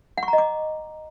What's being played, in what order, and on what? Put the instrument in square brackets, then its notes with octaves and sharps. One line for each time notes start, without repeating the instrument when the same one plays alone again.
[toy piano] F#5
C#6
A#5
D#5
D6